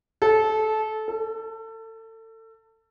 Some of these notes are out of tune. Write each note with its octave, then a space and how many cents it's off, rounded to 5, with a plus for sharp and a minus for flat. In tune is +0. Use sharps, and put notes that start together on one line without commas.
A4 -20
A4 +30